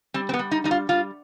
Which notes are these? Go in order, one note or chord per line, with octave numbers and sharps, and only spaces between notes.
G3 C4
C4
B3
G3
D#4
G3 D#4
F4
G3 F4